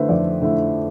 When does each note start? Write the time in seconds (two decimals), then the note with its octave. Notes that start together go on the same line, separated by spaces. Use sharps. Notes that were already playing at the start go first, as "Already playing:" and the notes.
Already playing: D3 A3 E4 B4 C5
0.09 F2 D5
0.42 D3 A3 E4